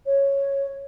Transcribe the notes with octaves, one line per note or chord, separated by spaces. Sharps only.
C#5